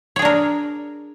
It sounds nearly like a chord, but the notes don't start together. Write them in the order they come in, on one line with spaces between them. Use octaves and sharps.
C#5 G#4 D4 A#4